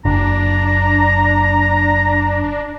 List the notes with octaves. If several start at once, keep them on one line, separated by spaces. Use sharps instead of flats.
F#1 D4 A#5